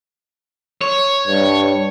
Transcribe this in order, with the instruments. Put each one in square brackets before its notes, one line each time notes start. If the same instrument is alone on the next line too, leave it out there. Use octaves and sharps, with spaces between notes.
[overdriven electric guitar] C#5
[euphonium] G2